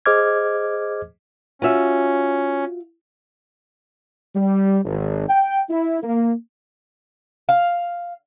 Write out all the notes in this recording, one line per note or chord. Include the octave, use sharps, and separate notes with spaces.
G#4 C5 D#5 D6 F6 G#6
C#4 F4 F#4 E5
G3
G#1
G5
E4
A#3
F5